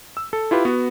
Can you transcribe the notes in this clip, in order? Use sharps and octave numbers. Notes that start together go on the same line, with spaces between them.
E6
A4
E4 F4 G4 B4
B3 F#4